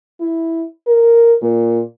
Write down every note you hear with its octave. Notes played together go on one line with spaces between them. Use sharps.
E4
A#4
A#2